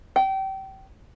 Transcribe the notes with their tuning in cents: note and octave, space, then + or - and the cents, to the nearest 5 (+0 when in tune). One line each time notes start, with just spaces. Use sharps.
G5 -25